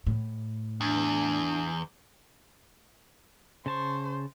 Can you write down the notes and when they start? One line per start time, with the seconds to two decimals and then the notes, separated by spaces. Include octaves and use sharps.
0.07 A2
0.81 E2 D4
3.66 C#3 C5 A5 C#6